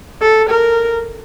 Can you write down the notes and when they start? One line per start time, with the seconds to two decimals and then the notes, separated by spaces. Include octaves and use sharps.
0.22 A4
0.50 A#4